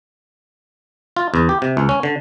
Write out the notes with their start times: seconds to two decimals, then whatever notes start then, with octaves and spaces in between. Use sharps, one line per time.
1.17 F4
1.34 E2
1.49 G4
1.62 C3
1.77 C#2
1.89 C#4
2.03 D3